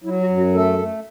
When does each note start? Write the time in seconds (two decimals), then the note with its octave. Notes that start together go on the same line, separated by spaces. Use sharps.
0.04 F#3 E4
0.21 F#4
0.29 F#2
0.37 F#4
0.54 A3 A4
0.79 A3